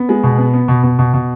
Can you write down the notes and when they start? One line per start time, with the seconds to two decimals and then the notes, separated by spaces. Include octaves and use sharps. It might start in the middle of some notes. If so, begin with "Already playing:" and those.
Already playing: B3
0.09 G#3
0.23 B2
0.38 B3
0.54 B3
0.68 B2
0.83 B2
0.99 B2
1.14 B2